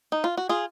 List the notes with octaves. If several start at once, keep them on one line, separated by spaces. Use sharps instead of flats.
D#4
F4
F#4
F4 G#4